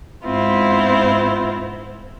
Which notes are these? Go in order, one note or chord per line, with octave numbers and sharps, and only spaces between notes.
G#2 B3 C4 E4 F4